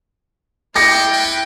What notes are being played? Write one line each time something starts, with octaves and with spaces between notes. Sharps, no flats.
E4 F4 G5 D6 A#6 C#7
B4